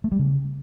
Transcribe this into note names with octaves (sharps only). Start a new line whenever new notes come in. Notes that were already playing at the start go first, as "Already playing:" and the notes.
A3
G3
C#3